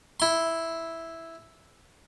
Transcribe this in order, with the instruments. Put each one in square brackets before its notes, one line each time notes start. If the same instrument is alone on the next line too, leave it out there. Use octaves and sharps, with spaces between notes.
[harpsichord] E4 C6